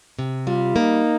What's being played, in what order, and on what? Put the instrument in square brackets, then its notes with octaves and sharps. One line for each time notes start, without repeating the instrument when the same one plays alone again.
[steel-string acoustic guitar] C3
[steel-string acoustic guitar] G3 [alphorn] F4
[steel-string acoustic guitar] A#3 [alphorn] D#4